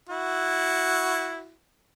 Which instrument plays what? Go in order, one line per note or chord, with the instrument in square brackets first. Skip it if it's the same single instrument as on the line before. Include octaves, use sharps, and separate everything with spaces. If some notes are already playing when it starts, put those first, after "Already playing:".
[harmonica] E4 F#4